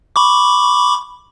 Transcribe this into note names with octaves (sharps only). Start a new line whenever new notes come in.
B5 C#6 D6